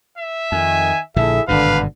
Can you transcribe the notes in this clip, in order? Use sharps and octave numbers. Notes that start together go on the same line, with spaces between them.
E5
F2 D#3 G#5
A#1 A#2 D3 E4 G#4 A4 E5
G#1 G2 B2 D3 B4 F5